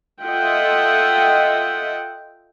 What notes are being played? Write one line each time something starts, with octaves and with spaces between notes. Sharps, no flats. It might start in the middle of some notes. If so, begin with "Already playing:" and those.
F4 A4 D#5 E5 F#5 G5